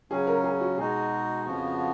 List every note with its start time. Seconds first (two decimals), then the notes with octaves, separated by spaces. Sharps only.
0.11 C#3 F#3 C#4 G#4
0.27 A#4
0.44 G#4
0.61 F#4
0.77 B2 G#3 D#4 F#4 G#4
1.45 F2 C#3 F3 B3 F#4